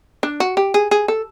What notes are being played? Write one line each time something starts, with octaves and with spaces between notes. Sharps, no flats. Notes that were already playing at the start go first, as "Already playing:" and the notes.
D4
F#4
G4
G#4
G#4
A4